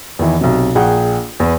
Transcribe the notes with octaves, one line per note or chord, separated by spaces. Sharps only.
E2 D#3 E3
B1 C3
A#1 G#4 F#5 G5
E2 B4